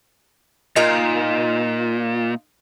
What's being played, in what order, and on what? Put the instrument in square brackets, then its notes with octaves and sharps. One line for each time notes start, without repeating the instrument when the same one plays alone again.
[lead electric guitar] A#2 [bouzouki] D#4 F4 A#4